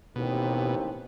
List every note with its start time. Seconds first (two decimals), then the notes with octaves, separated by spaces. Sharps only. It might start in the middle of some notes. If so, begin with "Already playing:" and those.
0.16 A1 D#2 B2 C4